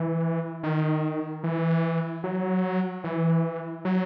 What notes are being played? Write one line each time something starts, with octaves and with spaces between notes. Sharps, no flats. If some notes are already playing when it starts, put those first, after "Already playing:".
Already playing: E3
D#3
E3
F#3
E3
F#3